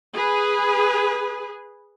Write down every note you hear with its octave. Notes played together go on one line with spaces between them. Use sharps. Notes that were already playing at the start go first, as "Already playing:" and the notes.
G#4 B4